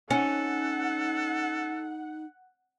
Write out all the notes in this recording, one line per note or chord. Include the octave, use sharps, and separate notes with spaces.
C#4 D#4 A4 F#5